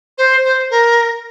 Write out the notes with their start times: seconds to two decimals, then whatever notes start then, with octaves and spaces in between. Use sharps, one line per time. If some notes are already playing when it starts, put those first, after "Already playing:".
0.18 C5
0.45 C5
0.70 A#4